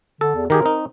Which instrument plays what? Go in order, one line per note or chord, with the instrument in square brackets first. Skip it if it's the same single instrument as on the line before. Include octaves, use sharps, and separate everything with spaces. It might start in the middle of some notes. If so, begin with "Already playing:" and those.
[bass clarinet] D3 [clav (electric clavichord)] A4
[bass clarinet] E2
[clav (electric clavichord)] D#3 G4 G#4 [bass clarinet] A#4
[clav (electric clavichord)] C4 D#4